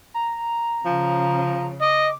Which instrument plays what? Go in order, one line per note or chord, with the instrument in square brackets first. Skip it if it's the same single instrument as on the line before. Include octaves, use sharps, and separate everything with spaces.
[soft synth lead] A#5
[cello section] C#3 [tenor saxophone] F3
[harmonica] D#5 [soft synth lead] D6